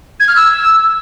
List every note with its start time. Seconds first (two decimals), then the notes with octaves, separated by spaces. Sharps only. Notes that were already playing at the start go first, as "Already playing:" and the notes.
0.20 G#6
0.28 F6
0.36 E6